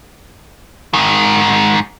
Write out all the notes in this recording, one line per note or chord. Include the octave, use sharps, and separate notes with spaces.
G#2 D#3